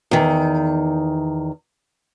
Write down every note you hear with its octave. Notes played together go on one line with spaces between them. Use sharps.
E2 D#3